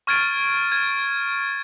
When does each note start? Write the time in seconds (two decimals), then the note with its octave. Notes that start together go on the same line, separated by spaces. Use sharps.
0.07 C#6 F6 G#6 A6 D7 D#7
0.72 G#6